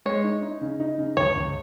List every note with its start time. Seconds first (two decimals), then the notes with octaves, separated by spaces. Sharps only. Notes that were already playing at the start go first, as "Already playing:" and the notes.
0.06 G#3 C#5
0.24 D#4
0.43 D#4
0.61 C#3
0.80 D#4
0.98 C#3
1.17 C#2 C#5
1.35 C#2